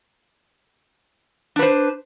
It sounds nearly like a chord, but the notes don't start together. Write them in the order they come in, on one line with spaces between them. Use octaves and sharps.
D4 B4 C5